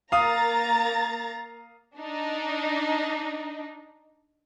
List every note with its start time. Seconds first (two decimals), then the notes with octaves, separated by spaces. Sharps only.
0.12 A#3 F5 A#5 D#6 A6
1.98 D4 D#4